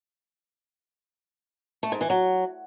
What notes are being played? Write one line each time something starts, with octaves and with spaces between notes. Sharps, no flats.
A3
G#2
E3
F#3